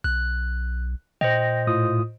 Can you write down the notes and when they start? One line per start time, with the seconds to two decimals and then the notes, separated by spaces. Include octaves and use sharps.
0.04 B1 F#6
1.21 A#2 C5 D#5 G5 A#6
1.67 A2 F4 D#6